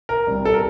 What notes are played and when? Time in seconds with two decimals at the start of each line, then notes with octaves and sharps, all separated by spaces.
0.09 A#4
0.27 C2 C3 G3
0.45 A4
0.54 A#4